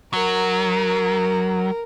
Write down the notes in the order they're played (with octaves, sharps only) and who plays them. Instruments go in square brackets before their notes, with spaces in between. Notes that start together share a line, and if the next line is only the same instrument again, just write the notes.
[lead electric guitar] F#3 [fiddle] A#4